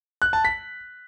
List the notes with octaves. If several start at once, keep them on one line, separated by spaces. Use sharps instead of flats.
F#6
A5
B6